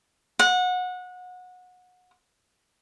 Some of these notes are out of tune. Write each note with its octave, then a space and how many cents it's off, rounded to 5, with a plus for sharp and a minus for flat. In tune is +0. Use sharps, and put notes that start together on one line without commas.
F#5 -25